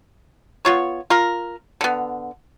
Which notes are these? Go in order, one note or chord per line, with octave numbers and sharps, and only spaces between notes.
B3 F4 C#5
F4 A#4
D3 B3